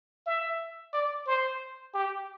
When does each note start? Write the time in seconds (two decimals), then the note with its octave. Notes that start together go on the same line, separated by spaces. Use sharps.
0.27 E5
0.94 D5
1.27 C5
1.94 G4